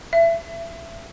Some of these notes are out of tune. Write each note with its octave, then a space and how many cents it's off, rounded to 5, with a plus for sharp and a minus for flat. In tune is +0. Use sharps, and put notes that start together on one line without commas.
E5 +25